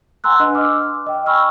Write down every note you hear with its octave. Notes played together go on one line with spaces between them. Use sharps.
F#5 G#5 A#5 C6 E6 F#6
D4 B4 D#5
D6 F6
D#5 G5
G5 G#5 B5 C#6 E6 F6